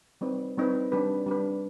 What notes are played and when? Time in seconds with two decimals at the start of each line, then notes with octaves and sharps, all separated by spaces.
0.21 G3 C4 D#4 B4
0.57 G3 C4 D#4 B4
0.92 G3 D4 G4 B4
1.27 G3 D4 G4 B4